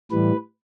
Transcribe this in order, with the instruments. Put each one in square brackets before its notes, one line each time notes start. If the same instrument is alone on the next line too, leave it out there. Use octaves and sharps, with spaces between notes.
[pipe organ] A2 E3 G3 B4